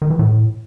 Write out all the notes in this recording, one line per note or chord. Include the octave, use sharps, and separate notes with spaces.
D#3
E3
A2